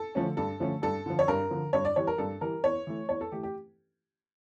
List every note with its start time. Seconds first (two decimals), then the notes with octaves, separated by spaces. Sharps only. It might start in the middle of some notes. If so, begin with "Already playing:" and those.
Already playing: A4
0.15 D3 F3 A3 C#4
0.37 G2 A4
0.60 D3 F3 A3 C#4
0.82 G2 A4
1.06 D3 F3
1.19 C#5
1.28 G2 A#4
1.51 D3 F3
1.73 G2 C#5
1.85 D5
1.96 E3 G3 C#5
2.07 A#4
2.18 G2 A4
2.41 E3 G3 A#4
2.64 E2 C#5
2.87 E3 A3
3.09 E2 C#5
3.21 A4
3.32 E3 A3 G4
3.43 G4